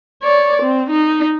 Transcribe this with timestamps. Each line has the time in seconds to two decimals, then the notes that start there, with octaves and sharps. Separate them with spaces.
0.23 C#5 D5
0.62 C4
0.90 D#4